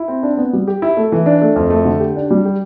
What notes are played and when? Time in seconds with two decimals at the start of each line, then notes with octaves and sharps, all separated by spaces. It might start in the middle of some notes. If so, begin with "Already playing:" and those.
Already playing: E4
0.08 C4
0.23 D4
0.37 B3
0.53 G3
0.67 G4
0.82 E4
0.97 A3
1.12 E3
1.26 D4
1.42 A3
1.56 F2
1.70 A3
1.85 D3
2.00 G4
2.16 D4
2.31 G3
2.45 G4